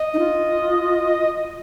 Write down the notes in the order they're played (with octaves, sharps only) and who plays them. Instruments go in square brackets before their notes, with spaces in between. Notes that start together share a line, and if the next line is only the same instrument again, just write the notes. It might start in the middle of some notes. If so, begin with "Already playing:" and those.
Already playing: [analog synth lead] D#5
[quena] D#4
F4